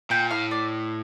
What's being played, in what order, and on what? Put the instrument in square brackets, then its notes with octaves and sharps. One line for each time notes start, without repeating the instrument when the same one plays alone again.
[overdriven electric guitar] A#2 [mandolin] G5
[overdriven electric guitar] A2 [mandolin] F5
[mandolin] D5